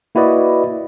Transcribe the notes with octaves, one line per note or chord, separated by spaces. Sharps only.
A#3 E4 F#4 B4 D5 D#5